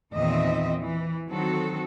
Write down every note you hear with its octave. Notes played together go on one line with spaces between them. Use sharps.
E2 A#2 D#3 C4 D#5 E5
E3
D#3 F#3 C4 F#4 A4